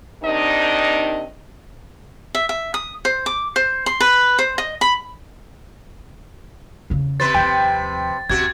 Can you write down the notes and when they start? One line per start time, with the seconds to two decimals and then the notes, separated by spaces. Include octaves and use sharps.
0.23 C3 D#3 D4 D#4 D#5
2.35 E5
2.49 E5
2.74 D#6
3.05 C5
3.26 D6
3.56 C5
3.86 C6
4.00 B4
4.39 C5
4.58 D#5
4.81 B5
6.90 E2 C#3
7.20 C3 B4 C5 A6
7.35 D#2 F3 G5
8.30 D#2 C3 F#4 G#6